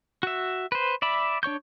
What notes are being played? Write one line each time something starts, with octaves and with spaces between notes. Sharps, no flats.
F#4 E5
B4 C5
D5 E5 B5
D4 C#5 C#6 G6